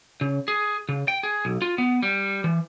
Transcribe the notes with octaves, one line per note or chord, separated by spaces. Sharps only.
C#3
G#4
C#3
G5
G#4
B1
F4
B3
G3
E3